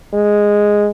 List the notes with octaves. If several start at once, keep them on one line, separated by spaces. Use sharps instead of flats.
G#3